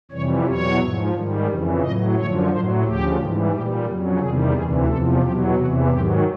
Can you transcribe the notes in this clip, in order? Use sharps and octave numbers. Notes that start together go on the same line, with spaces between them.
F2 C3 E3 G3 C#5
E2 B2 F#3 C#5
G#2 F3
G#2 D#3 G3
F2 C#3 E3
A2 F#3 D#5
F#2 D3 F3 C#5
A2 F#3 C5
D2 C#3 F3 G4
G#2 E3 G3
A#2 G3 G4
F2 C#3 F#3
E2 C3 D#3 G3 G#4
D2 C3 E3 G#4
E2 C3 F3 A4
E2 B2 F#3 G4
E2 C3 E3 F#4
G#2 D#3 F#3 G4